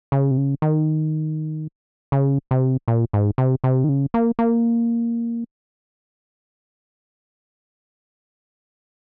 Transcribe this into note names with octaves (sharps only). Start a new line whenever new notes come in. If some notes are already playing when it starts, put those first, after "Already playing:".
C#3
C3
C#3
D#3
C#3
C3
A#2
G#2
C3
C3
D#3
C#3
A#3
A#3